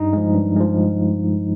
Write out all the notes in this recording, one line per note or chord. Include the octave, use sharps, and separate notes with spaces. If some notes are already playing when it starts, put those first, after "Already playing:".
Already playing: G2 D#4
F3 G#3
G2
F3 G#3